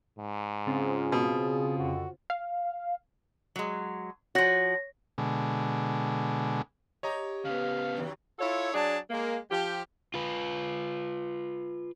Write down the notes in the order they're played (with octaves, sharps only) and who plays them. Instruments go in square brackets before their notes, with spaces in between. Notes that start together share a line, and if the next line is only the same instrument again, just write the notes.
[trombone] G#2
[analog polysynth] C#3 C4 F4 [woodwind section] G#4
[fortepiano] B2
[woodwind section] F2 D3 [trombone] F#4
[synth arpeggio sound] F5
[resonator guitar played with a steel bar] F#3 G#3
[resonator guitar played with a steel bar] F3 F#4 [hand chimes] C#5 A#6
[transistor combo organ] B2 D3 G#3
[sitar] G4 [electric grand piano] C#5 D#5 A#5
[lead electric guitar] C#3 B3 [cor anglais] F5
[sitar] F#2 D#3 E3
[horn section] E4 F4 A4 C#5
F#3 D4 G#4 D5 A5
G#3 A#3
F3 G4
[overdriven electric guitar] F4 B4